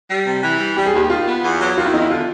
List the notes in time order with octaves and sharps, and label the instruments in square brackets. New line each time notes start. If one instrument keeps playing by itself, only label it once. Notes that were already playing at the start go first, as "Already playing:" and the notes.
[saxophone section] G3
C3
E3
G3
[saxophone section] G3 [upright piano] G4
[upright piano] G#4
[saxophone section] D#2 [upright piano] G4
[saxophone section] D#3 [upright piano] F4
[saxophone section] B3
E2
F#3
[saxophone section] D#3 [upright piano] F4
[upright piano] E4
[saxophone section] E2 [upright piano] D#4
[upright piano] E4
[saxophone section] D3 [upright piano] F4